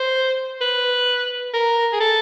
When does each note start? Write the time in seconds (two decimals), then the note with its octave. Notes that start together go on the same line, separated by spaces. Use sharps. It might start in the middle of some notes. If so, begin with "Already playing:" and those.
Already playing: C5
0.61 B4
1.54 A#4
1.93 G#4
2.00 A4